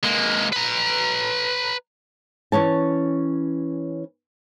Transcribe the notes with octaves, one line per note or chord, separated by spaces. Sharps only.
G#3 A#3
B4 A#5
E3 C#4 C#5 A5